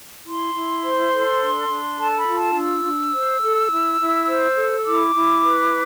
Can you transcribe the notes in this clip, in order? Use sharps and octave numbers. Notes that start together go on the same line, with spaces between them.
E4 C6
E4
C5
A4
D4
D4
A4 A5
B5
F4
A5
D4 E6
D4
C5
A4
E4
E4
C5
A4
E4 D6
E4
B4